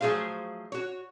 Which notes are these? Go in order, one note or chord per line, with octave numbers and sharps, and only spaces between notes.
F3 F#3 A3 G#4 C5 F5
F#4 C#5